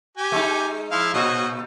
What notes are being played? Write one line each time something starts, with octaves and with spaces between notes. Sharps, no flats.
G4 G#5
G#3 D#4
F3 E4 F5
A#2 F#4 C#5 D#5